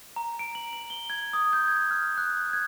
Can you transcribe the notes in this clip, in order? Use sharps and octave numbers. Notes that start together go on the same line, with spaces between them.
A#5
D7
F#7
F#7
G7
G#6
D#6
G6
G#6
F6
F#6
G#6